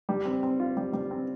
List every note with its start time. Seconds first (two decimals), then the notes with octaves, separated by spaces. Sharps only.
0.09 G3
0.25 C4
0.43 C4
0.60 F4
0.77 G3
0.93 G3
1.11 C4